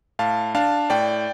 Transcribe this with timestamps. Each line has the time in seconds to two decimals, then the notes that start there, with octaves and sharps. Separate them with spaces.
0.19 A2 F5 A5
0.55 D4 F5 A5
0.90 A2 D5 G5